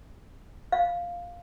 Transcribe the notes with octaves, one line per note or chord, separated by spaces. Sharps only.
F5